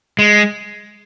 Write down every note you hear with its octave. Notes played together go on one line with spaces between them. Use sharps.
G#3